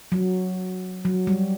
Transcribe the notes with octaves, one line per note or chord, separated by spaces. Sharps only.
F#3
F#3
G3